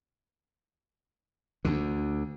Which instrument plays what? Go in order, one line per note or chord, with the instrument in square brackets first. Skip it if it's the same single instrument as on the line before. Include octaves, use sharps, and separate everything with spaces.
[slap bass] D2 D3